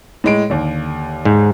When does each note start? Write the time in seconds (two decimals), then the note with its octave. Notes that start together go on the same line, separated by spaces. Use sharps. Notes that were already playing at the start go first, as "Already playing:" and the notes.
0.24 A2 G#3 D7
0.50 D#2 D3
1.25 G#2